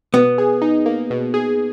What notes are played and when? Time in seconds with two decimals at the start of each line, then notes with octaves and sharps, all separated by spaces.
0.13 B2 B3
0.38 G#4
0.62 D#4
0.86 A#3
1.10 B2
1.34 G#4